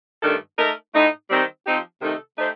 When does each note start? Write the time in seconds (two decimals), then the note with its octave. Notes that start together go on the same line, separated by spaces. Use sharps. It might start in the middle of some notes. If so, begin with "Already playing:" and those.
0.23 G2 D#3 A3 D4 A4
0.58 A3 D#4 A#4
0.95 A2 A3 D#4
1.30 D#3 G3 C4
1.66 F3 C4 D#4 G4
2.02 C3 D#3 A3 D#4 A4
2.37 A3 D#4 G4 C5